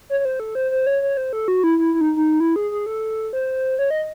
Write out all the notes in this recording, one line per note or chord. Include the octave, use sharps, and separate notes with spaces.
C#5
C#5
C5
A4
C5
C5
C#5
C#5
C5
A4
F#4
E4
E4
E4
D#4
D#4
E4
G#4
G#4
A4
C5
C#5
D#5